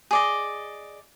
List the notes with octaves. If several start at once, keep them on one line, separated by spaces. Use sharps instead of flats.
G#4 D5 D#5